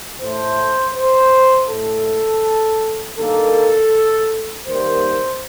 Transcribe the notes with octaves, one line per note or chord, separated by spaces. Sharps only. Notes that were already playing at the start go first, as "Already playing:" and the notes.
A2 A3 C5
C5
A2 A3 A4
G2 D#3 A#3 A4
D#2 D#3 G3 A#3 C5